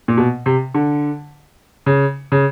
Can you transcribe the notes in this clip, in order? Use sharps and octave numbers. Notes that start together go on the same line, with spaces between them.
A#2
B2
C3
D3
C#3
C#3